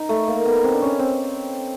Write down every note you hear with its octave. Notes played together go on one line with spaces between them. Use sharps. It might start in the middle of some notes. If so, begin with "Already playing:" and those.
Already playing: D#4
A3
A#3
B3
C4
D4
C#4
C4